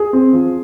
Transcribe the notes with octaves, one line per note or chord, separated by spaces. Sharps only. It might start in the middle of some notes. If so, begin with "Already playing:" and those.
Already playing: G#4
C4
F3